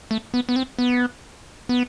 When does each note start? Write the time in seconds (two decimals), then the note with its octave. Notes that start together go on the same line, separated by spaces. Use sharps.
0.11 A3
0.34 B3
0.49 B3
0.56 C4
0.79 B3
1.69 B3